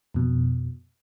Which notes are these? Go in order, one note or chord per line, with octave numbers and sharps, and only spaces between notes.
F2 B2